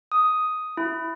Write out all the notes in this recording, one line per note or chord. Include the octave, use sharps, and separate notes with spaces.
D#6
E4